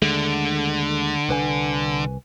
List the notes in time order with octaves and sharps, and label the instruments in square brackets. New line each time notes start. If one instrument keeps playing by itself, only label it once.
[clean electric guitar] D#2 G#3 A3 [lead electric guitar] D3
[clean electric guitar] C2 B4 G#5